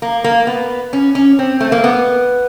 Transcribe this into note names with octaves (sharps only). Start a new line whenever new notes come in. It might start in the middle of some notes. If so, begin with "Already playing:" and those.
A#3
A#3
B3
C#4
C#4
C4
A3
A#3
B3